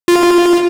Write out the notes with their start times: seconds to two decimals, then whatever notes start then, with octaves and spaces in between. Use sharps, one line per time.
0.08 F4